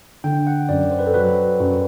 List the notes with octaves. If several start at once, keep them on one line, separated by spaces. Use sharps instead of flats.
D3 G5
F#5
F#2 D5
C5
B4
A4
F#3 B4
F#2